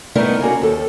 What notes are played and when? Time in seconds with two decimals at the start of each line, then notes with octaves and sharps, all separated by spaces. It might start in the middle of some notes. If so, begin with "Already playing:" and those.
0.15 G3 A3 B3 D#4 E4 A#4
0.41 A#3 C#4 F#4 A#4
0.61 D#2 A4